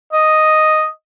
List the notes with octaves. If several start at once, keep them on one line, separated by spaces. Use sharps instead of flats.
D#5